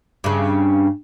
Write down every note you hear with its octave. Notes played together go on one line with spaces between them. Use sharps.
G2 C#3